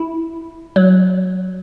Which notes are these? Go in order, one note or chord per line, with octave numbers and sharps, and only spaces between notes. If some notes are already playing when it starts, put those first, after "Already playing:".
Already playing: E4
F#3